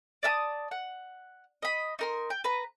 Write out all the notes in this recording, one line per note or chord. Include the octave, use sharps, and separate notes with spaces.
D5 E5 A5 D#6
F#5
D#5 B5
D#4 A#4 C6
G5
B4 A#5